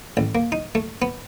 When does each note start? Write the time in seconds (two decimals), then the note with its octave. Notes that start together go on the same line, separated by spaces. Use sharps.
0.17 A1
0.35 A#3
0.52 D#4
0.75 A3
1.02 B3